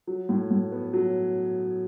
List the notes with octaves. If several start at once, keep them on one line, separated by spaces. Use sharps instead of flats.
F#3
A2
A2
B3
F#3